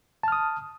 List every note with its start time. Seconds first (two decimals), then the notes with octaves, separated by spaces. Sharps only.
0.23 A5
0.28 F6
0.32 D#6